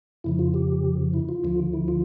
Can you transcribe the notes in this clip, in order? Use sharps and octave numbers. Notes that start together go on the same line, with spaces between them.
F2 C#3 F3 E4
F4
G4
E4
F4
D2 D3 F3
E4
F4